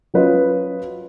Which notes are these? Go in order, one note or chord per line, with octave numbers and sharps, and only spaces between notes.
F#3 C#4 F4 B4 D#5